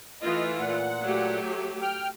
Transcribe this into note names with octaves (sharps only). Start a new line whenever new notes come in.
E3 A3 F4 D#5
A#2 F#5
F#3 A3 G4
G5 F6